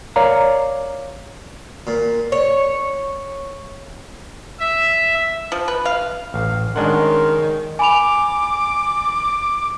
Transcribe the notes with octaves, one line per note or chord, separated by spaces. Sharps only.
A#4 C#5 D5 F5 A#5
A#2
C#5
E5
F3
B4
F5
A1 F5
D#3 G#3 C#4 D4 A#4 F#5 C6
G#5 B5 D6 F7